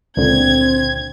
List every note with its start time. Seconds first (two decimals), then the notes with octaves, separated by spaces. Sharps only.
0.17 C#2 A#2 D3 C4 G#6